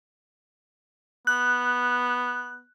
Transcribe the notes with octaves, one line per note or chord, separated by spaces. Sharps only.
B3 F#6